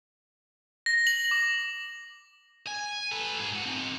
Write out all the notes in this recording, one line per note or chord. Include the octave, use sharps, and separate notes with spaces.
A#6
F#7
D6
G#5
A4 B4
G#2 G#4
F3 F#5
C4 D#4